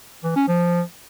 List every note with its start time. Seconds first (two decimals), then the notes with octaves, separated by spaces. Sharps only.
0.24 E3
0.36 C#4
0.48 F3